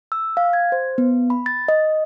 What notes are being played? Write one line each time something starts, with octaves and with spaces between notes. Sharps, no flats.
E6
F5
G#6
C5
B3
B5
A6
D#5